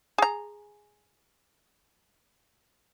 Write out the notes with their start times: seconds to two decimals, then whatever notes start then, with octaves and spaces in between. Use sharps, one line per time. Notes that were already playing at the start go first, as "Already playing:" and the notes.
0.18 G#4 A#5